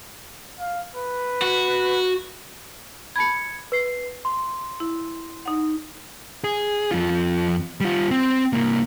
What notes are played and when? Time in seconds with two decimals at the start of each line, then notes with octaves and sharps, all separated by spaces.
0.59 F5
0.95 B4
1.42 F#4
3.16 A5 B5 G#6 C#7
3.72 B4 C7
4.25 C6
4.80 E4
5.46 D#4 F#5
6.44 G#4
6.91 F2 F4
7.81 G3 F4
8.11 C4
8.53 C2 A#3